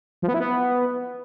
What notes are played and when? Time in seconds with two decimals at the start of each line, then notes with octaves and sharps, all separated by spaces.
0.22 F3
0.28 B3
0.34 E4
0.40 B3